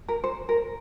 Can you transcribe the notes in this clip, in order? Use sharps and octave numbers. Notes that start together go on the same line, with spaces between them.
A#4
C5
A#4